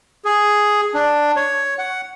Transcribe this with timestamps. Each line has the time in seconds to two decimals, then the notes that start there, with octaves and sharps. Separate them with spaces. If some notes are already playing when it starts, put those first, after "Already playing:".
0.25 G#4
0.94 D4
1.36 C#5
1.79 F#5